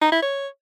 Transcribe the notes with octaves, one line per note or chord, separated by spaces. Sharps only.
D#4
E4
C#5